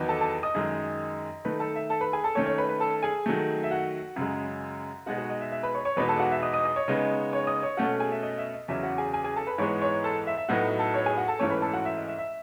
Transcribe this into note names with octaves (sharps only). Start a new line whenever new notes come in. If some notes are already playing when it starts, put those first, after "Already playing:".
Already playing: E2 D#3 F#3 B3 D#4
A4 A5
A4 A5
D#5 D#6
F#2 D#3 G#3
D#3 A3 D#4 B4 B5
A4 A5
E5
A4 A5
B4 B5
G#4 G#5
A4 A5
D#3 A3 C#4 C#5 C#6
C#5 C#6
B4 B5
B4 B5
A4 A5
G#4 G#5
D#3 F#3 A3
E5
F#4 F#5
F#2 C#3 G#3
B2 G#3 D#4 F#4 F#5
F#4 F#5
D#5
E5
E5
B4 B5
C#5 C#6
C#5 C#6
E2 B2 G#3 B3 D#4 B4 B5
A4 A5
F#4 F#5
E5
D#5 D#6
D#5 D#6
D#5 D#6
C#5 C#6
C#3 G#3 B3 D#4
C#5 C#6
D#5 D#6
C#5 C#6
B2 A3 C#4 F#4 F#5
G#4 G#5
E5
D#5
E5
D#5
E2 C#3 F#3 C#4 E5
F#4 F#5
G#4 G#5
G#4 G#5
G#4 G#5
A4 A5
B4 B5
G#2 E3 G#3 B3 C#5 C#6
C#5 C#6
A4 A5
E5
E5
A2 F#3 B3 D#4 F#4 F#5
A4 A5
C#5 C#6
G#4 G#5
F#4 F#5
A4 A5
G#2 E3 A3 C#4 C#5 C#6
B4 B5
A4 A5
F#4 F#5
E5
D#5
E5
E5